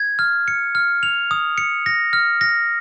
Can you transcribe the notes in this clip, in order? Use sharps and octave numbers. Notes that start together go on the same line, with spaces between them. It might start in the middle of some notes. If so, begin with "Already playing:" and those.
Already playing: G#6
F6
C#7
F6
F7
D#6
C#7
A#6
F6
A#6